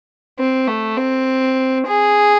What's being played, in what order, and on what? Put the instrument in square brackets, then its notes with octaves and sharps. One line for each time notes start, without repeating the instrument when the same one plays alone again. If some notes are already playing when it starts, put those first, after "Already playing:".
[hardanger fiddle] C4
A3
C4
G#4